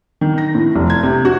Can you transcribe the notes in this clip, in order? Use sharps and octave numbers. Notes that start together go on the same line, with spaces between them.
D#3
A#6
A2
F1
G#6
C3
F#4